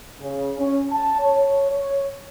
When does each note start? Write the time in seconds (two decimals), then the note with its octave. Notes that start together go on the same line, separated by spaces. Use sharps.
0.20 C#3
0.58 C#4
0.91 A5
1.19 C#5
1.70 C#5